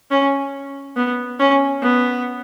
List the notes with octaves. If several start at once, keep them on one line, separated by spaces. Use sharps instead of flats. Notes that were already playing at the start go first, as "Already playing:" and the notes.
C#4
B3
C#4
B3